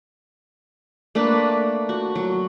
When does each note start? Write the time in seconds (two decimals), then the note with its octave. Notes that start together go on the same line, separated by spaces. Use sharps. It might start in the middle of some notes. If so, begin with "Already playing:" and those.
1.15 A3 A#3 D4 B4
1.89 F#4
2.15 F#3